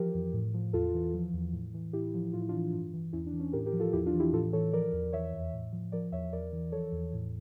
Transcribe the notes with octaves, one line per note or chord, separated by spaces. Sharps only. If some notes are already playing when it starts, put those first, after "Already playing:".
Already playing: E3 F3 G4 A#4
F2
A2
F3
E2 F4 A4
E3
F3
E2
A2
E3
A2 E4 G4
F3
A2 F4
E4
E3 D4 F4
G2
E3
E2 C#4 E4
D4
E3
C#4
A2 G4 A#4
G4 A#4
F3
F4 A4
E2 E4 G4
D4 F4
E3
E4 G4
A2 F4 A4
E3 A4 C#5
F3 A#4 D5
E2
E3 C#5 E5
F2
A2
F3
F3 A#4 D5
E2 C#5 E5
E2 A#4 D5
E3
F3 A4 C#5
E2
A2